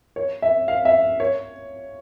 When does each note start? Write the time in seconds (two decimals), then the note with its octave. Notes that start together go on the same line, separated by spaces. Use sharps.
0.16 C#5
0.42 E5
0.68 F5
0.85 E5
1.20 C#5